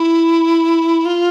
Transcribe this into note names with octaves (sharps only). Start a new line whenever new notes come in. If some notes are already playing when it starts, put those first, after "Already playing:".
Already playing: E4
F4